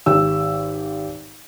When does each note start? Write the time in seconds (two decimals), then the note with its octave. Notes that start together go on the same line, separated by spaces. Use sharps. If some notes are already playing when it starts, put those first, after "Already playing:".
0.06 G#1 G4 E6